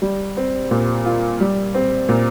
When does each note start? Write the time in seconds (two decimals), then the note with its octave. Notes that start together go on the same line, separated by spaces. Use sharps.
0.02 G3
0.37 C4
0.71 A#2
1.05 F4
1.40 G3
1.74 C4
2.09 A#2